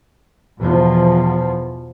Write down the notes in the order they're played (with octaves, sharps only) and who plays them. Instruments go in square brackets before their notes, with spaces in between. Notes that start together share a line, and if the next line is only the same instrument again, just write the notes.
[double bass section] E2 B2 F3